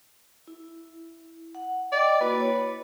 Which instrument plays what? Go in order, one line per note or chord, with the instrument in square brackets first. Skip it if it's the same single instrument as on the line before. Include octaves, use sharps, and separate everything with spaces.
[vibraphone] E4
F#5
[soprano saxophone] D5 [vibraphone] D#5 G5
[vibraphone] A#3 E4 F#4 [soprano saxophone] B4
[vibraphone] C#5